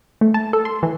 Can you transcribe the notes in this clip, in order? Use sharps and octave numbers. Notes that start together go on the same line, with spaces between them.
A3
A5
A4
C6
E3